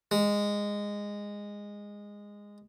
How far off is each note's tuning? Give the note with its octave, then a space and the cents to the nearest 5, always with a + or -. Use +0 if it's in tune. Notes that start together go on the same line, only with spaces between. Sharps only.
G#3 -15